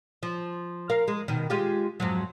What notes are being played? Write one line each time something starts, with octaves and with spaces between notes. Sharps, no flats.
F3
A#4 F5
G#3
B2 D#3
G#3 F4 G4
F2 G#2 F#3